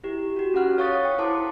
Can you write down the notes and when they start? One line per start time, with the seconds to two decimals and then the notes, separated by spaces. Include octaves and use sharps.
0.04 E4 G4
0.36 F#4 G4
0.54 C#4 F4 F#5 F6 F#6
0.78 A4 C#5 F5 C#6 D#6 A6
1.05 G5
1.18 E4 A4 C5 A5 C6 D6